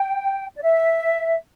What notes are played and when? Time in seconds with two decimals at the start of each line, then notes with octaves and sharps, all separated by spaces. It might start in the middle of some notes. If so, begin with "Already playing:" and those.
Already playing: G5
0.56 D5
0.62 E5